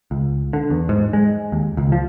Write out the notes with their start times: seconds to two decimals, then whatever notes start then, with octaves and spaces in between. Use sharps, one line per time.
0.11 C#2
0.53 D3
0.70 E2
0.89 G#2
1.13 G#3
1.52 D#2
1.77 C#2
1.92 F3